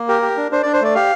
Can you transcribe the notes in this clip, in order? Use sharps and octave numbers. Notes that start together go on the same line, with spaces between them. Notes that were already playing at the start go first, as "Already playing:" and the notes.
Already playing: A#3
G4 A#4
G4
D4
D4 C5
D4 D5
C5
A3 D5
G4 F5